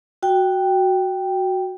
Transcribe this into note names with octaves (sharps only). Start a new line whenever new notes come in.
F#4 G5